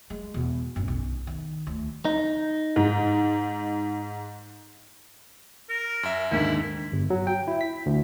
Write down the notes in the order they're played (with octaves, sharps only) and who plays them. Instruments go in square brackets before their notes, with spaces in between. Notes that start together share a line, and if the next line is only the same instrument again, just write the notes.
[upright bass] G#3
E2 B2
F#2 C#4
B1
D#3
D2
[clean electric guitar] D#4
[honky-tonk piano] G#2
[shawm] A#4
[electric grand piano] F#2 E5
[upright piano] D#2 G#2 D3 [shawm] E4
[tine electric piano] G1
F#3
G5
E4
B6
D2